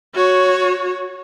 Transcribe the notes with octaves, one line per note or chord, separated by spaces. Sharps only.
F#4 C#5